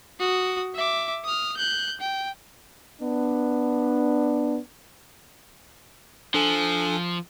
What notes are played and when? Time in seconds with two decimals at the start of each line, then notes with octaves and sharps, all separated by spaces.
0.20 F#4 D#6
0.75 E5 D6
1.25 D#6 F6
1.57 F#6 G6
2.00 G5
3.02 B3 D4
6.34 F3 D4 A4 G#5